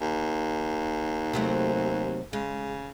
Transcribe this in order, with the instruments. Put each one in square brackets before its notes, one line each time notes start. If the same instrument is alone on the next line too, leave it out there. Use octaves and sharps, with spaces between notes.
[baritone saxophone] D#2
[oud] C3 F#3 A3
[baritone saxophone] C#3 [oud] G#3